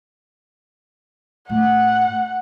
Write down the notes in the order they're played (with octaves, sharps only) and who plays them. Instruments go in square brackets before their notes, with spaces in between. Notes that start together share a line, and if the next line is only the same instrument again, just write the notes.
[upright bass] A2 [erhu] F#5